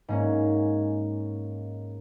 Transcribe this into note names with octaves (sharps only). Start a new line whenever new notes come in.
G#2 A#3 C#4